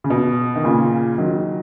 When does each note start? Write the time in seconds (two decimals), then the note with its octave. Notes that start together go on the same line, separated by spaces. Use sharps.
0.04 C#3
0.10 B2
0.56 D#3
0.64 A#2 C#3
1.18 D#3 F#3